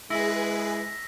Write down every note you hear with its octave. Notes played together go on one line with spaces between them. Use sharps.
G#3 E4 G#4 B4 E6 A#6 B6